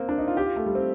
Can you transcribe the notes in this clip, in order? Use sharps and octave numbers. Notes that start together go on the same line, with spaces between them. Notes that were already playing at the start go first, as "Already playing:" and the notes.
Already playing: A#3 C4
D4
D#4
F4
G4
F4
A3
G3
C4